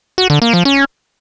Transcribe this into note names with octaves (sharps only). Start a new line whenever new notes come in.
F#4
D3
A#3
F3
C#4